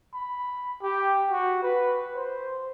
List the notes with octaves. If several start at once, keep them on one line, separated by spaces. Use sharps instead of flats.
B5
G4
F#4
B4
C5